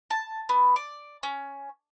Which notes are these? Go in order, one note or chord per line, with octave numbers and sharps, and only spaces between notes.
A5
B3
D5
C#4